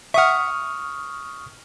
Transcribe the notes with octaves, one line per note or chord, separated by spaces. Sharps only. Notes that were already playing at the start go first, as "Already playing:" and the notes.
E5 F#5 C#6 D#6 F6